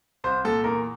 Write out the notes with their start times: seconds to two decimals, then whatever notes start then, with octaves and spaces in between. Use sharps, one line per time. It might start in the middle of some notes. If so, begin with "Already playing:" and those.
0.24 C2 C5
0.45 A#2 A4
0.64 E2 A#4